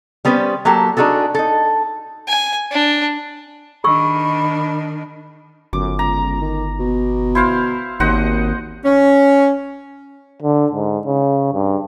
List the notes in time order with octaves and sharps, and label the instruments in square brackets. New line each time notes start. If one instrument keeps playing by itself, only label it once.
[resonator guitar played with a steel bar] G3 B3 C#4 B4 C5
F#3 A#3 G4 A4
D4 D#4 F#4 G#4 A4
D#4 A4
[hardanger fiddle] G#5
D4
[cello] D#3 D4 [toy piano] G#4 C#6 E6 [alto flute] B5
[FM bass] G1 [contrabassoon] F#2 [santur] D6
[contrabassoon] C#2 [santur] A#5
[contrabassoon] D#3
B2
[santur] E4 C5 F5
[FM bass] G#1 [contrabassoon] D#2 [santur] C5 D#5 F#5
[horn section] C#4
[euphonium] D3
G#2
C#3
G2